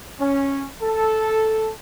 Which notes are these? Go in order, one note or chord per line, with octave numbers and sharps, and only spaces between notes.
C#4
A4